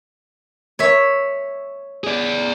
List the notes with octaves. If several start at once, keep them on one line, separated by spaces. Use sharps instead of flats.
C#5 E5
G#4 D5